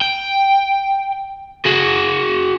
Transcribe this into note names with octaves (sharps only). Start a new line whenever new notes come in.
G5
F#4 G#4